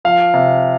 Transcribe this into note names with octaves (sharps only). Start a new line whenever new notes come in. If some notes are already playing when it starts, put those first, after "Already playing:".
F3 F5
C3